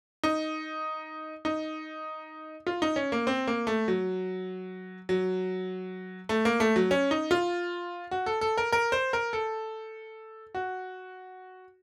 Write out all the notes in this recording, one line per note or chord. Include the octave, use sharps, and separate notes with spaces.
D#4
D#4
F4
D#4
C#4
A#3
C4
A#3
A3
F#3
F#3
A3
A#3
A3
F#3
C#4
D#4
F4
F#4
A4
A4
A#4
A#4
C5
A#4
A4
F#4